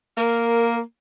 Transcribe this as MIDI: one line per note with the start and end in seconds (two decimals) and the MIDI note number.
0.17 0.80 58
0.17 0.75 70